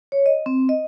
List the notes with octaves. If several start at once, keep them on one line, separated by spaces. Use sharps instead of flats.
C#5
D#5
C4
D#5